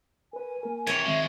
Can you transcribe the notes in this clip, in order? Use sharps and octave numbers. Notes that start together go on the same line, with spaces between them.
A#4 B4 G#5
A#3 A#4
C3 E3 A#4 C#5 A6
C2 D#3 F3 G#3 C4 E5